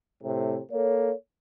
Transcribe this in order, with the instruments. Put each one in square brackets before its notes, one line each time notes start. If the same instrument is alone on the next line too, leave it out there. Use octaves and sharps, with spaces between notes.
[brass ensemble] A2 C3
A#3 A4 C#5